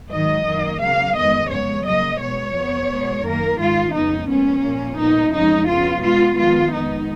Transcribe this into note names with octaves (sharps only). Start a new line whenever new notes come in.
G#2 D#3 F#3 D#5
F#2 D#3 A#3
C#3 F#3 A#3 F5
F2 D#3 G#3 B3 D#5
C#3 G#3 B3 C#5
C#3 F#3 A#3 D#5
B2 G#3 B3 C#5
F2 F3 B3
B2 G#3 B3
F#2 D#3 A#3 A#4
G#2 D#3 G#3 F4
F2 C#3 G#3 B3 D#4
A#2 F3 G#3 B3 C#4
A#2 F3 A#3
A#2 G#3 B3 D#4
F2 C#3 F3 G#3 D#4
C#3 F3 B3 F4
B2 G#3 B3 F4
F2 D#3 G#3 B3 F4
F2 D#3 G#3 B3 D#4